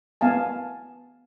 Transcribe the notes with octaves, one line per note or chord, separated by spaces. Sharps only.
B3 F5 G#5 A5